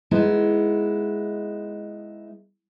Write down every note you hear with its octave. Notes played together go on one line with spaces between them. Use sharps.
G#3 B3 D#4 E4